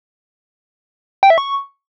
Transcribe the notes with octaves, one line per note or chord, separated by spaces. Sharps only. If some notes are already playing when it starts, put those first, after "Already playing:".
G5
E5
C#6